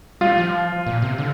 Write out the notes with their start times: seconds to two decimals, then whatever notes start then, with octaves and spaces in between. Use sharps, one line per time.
0.21 G3 F4
0.38 F3
0.87 A#2
1.02 C3
1.18 D3